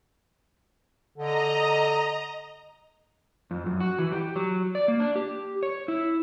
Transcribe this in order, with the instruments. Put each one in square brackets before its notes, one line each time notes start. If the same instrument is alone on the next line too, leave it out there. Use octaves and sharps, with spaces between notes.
[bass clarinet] D3 [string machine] D#5 A#5
[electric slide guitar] F2
F#2
F#4
E3
G4
F#3
D5
A#3
D4
G4
C#5
E4